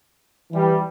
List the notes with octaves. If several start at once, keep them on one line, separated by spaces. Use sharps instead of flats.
E3 G3